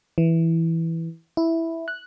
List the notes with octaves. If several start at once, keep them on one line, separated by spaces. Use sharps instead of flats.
E3
E4
F#6